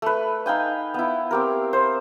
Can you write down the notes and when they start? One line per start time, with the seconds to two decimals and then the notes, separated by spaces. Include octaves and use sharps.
0.02 A3 B4
0.46 D#4 F5 G5 G#5
0.94 B3 E4
1.31 C4 G4 A#4
1.73 C5